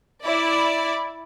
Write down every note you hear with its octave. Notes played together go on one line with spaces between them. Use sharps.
E4 D5